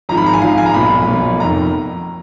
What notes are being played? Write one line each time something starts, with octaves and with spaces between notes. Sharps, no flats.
G#1 G#2 F3 A#5
B5
A#5
G#5
G#1 G#2 F3 F5
G#5
A#5
B1 A#2 F3 B5
B1 A#2 F3
F1 F2 D#3 A#5